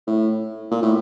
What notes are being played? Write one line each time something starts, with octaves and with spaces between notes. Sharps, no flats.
A2
A#2
A2